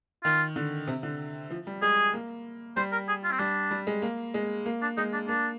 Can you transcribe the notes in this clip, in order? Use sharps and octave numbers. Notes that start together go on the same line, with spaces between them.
D#3 F4
D3
C3
D3
F3
G3
G#3 G#4
A#3
G3 C5
A#4
G#4
F4
C4
G3 D4
G3
G#3
A#3
G#3
A#3
D4
G#3 D#4
D4
A#3 D4